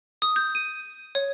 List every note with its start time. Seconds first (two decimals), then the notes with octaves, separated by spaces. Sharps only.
0.22 D#6
0.36 G6
0.55 D#7
1.15 C#5